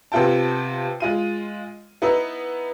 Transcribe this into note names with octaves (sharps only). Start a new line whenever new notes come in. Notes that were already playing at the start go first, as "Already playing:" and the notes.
C3 B3 F4 G5 A5
G#3 F4 D#7
B3 D#4 E4 B4 E5